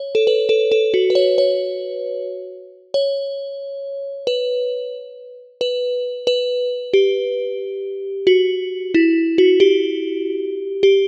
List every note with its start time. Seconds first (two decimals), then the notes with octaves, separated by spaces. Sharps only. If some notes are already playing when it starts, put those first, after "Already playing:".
Already playing: C#5
0.15 A4
0.27 B4
0.49 A4
0.72 A4
0.94 F#4
1.10 B4
1.15 C#5
1.38 C#5
2.94 C#5
4.27 B4
5.61 B4
6.27 B4
6.93 G4
8.27 F#4
8.94 E4
9.38 F#4
9.60 G4
10.83 G4